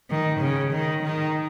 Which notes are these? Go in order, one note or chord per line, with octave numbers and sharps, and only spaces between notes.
D#3
C#3
D#3
D#3